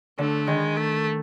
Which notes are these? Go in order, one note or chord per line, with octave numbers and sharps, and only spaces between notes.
D3 A3
D#3 G#3
A3